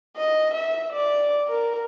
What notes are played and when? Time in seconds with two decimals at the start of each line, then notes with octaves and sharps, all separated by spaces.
0.16 D#5
0.54 E5
0.93 D5
1.48 A#4